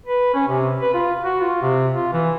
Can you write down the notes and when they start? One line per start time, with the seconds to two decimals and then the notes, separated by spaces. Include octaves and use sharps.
0.06 B4
0.34 C#4
0.49 C3
0.81 B4
0.94 F4
1.25 F#4
1.40 F4
1.62 C3
1.95 F4
2.13 E3